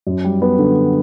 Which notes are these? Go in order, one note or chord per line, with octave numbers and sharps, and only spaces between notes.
F#2
G3
B3
D3